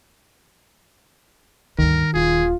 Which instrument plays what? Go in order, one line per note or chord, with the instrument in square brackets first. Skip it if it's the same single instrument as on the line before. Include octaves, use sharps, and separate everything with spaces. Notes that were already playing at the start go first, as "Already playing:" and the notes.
[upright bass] D2 G2 [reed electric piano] D#3 [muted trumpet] A#4
[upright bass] D#1 [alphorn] F4 [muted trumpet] G#4